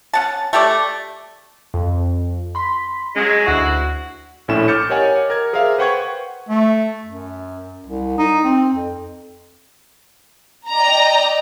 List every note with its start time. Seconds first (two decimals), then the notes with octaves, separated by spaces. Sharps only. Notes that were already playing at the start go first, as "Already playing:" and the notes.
0.13 C#4 F#5 A5
0.53 A3 G4 A4 D5
1.74 F2
2.55 B5 C6 B6
3.16 F#3 G#3 C#4 D#5
3.45 D2 E4 F#4 C7
4.48 A#1 A2 C#4 E4 A4 E7
4.68 D6 F6 G6 A6 C#7
4.89 G4 A#4 C#5 D#5 F#5 G#5
5.30 A#4 G#6
5.53 G#4 A#4 C5 E5 F5
5.78 B4 C5 F#5 G5 C#6 G#6
6.49 A3
7.06 F#2
7.86 C2
8.18 D#4
8.44 C4
8.74 F2
10.69 D5 D#5 G5 A#5